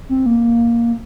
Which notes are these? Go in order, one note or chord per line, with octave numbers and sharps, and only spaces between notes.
C4
A#3